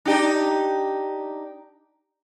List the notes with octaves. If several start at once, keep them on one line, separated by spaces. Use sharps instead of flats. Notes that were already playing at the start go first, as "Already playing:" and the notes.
D4 D#4 G4